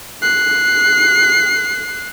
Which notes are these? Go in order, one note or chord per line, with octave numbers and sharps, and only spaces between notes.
F#6 C7